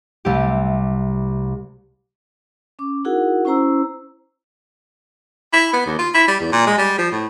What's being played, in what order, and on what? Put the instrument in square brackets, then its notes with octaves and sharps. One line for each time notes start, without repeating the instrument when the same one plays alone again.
[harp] C2 A3 G4
[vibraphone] C#4 D6
D#4 E4 F#4 G#4 A#4 F#5
C#4 E4 C5 A#5 E6
[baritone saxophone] E4
B3
D#2
F4
E4
G3
E2
A#2
G#3
G3
F3
A2